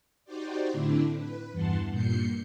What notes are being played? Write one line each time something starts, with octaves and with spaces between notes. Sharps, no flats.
D#4 F#4 G4 C5 D5
A2 D3 A3 C4 D4 E4
B4
E2 G2 E3 F#5 A5 C6
G2 A#2 G6 C7 C#7